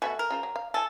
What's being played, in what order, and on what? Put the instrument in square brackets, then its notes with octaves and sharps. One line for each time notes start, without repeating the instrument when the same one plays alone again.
[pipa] B2 F#4 [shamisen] A3 E5 G#5
[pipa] A#4
[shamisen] C#3 F4 C5
F#3
F5
[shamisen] E3 G#5 [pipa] A4